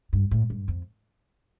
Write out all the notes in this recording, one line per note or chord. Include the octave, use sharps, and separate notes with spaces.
G2
A2
G2
F2